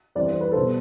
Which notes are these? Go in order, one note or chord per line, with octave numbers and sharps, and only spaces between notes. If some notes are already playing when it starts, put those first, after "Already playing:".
E3 G3 C4 D5
C5
B4
B2 G3 B3 A4 C5